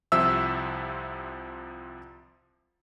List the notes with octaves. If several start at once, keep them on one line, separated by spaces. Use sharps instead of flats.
C2 C3 F3 E5 E6